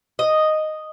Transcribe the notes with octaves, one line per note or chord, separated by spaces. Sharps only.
D#5